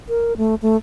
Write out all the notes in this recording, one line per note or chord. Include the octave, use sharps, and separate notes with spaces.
A#4
A3
A3